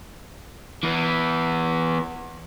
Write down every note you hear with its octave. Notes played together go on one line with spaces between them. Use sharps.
E3 B3